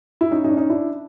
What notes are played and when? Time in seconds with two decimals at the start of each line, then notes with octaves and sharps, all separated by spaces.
0.21 E4
0.31 C#4 D#4
0.44 C#4 D#4
0.50 D4
0.57 C#4 D#4
0.70 D4 E4